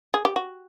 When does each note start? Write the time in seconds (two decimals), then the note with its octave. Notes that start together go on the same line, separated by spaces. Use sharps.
0.14 G#4
0.25 G4
0.36 F#4